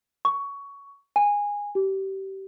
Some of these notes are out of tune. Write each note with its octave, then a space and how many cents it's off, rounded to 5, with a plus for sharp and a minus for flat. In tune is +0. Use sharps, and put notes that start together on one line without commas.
C#6 +15
G#5 -15
G4 -25